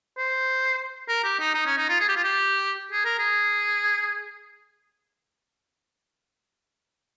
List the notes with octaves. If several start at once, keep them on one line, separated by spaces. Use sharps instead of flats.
C5
A#4
G4
D#4
D#4
C#4
D#4
F4
G#4
G4
F4
G4
G#4
A#4
G#4